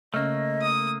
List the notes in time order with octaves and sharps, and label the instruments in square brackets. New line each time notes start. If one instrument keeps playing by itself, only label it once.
[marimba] C#3 C#4 [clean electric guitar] A3 A#3 [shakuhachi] D#5
[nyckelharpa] D#6